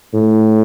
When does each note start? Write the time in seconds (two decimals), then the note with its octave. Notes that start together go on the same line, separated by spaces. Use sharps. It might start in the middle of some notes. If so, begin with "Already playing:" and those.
0.14 A2